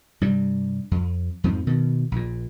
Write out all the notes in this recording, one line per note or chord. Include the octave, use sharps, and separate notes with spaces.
G2 C3 G3
F2
F2 G#2 F3 C4
B2 D#3
A#1 A#2